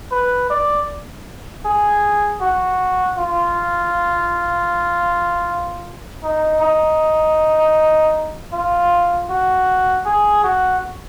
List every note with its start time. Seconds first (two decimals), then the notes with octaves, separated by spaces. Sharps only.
0.11 B4
0.50 D5
1.65 G#4
2.41 F#4
3.18 F4
6.24 D#4
6.61 D#4
8.53 F4
9.30 F#4
10.06 G#4
10.44 F#4